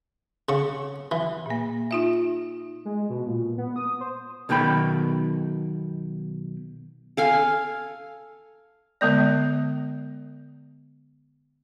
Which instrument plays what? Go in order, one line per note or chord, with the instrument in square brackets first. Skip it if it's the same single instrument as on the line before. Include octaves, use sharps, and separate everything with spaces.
[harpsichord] C#3 C#6
E3
[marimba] A#2 A#3
D#4 F4 E5
[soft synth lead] G#3
B2
A#2
B3
D#6
C5
[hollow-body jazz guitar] B1 B2 D#3 G5 B5
[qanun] A4 F5 G#5
[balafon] D3 G#3 B3 D5